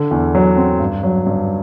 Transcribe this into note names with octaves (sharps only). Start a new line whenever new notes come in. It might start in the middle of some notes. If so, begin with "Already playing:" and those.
Already playing: D3
E2
F#3
C4
G2
F#3
G2